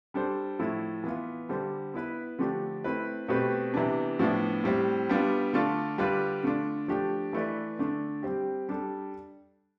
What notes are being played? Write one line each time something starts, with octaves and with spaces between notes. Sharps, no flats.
G3 D4 A4 C5
A2 F3 A3 E4
E3 B3 F4
D3 G3 D4 A4 C5
B3 E4 B4
D3 F3 A3 D4 G4
A3 C4 E4 B4
B2 A3 C4 G4 B4
C3 E3 B3 D4
A2 F3 B3 D4
A2 G3 C4
G3 B3 D4 F4
D3 A3 D4 F4 A4
D3 G3 D4 F4 B4
D3 A3 D4 F4
F3 A3 D4 G4
E3 A3 E4 B4 D5
D3 A3 D4
G3 C4 G4
G3 D4 A4